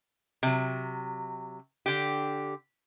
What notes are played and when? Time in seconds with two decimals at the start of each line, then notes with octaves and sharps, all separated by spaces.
0.43 C3 F#3
1.86 D3 G4